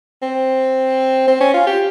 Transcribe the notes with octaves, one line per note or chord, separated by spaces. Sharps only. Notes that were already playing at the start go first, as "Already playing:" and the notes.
C4
C4
C#4
F4
G4